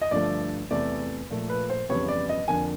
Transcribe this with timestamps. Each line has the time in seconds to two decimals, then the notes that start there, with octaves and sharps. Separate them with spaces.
0.01 D#5
0.11 G2 D3 F3 A3 D5
0.71 E2 C3 E3 A3 D5
1.30 A#2 F3 A3
1.50 B4
1.70 C5
1.89 F2 C#3 E3 G3 B3 C#5
2.08 D5
2.29 D#5
2.48 F2 D3 F3 A#3 G#5